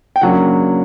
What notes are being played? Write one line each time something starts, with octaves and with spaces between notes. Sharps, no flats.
G5
C#3 F#3 A#3 D4 F#5